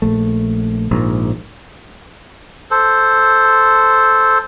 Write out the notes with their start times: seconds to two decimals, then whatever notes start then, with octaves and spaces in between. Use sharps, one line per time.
0.02 A#1 A3
0.91 A#1 G#2
2.71 A4 C5